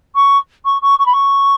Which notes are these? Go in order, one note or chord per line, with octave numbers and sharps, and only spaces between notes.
C#6
C#6
C#6
C#6
B5
C#6